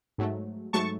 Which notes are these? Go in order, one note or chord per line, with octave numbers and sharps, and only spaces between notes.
G#2 F#3 A3
G#2 F#3 A3 A5 C#6